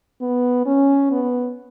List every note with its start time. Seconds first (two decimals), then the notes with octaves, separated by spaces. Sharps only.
0.21 B3
0.66 C#4
1.11 B3